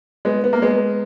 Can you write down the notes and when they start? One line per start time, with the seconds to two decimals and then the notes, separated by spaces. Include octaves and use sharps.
0.25 G#3 B3
0.44 B3
0.53 A#3
0.62 G#3 B3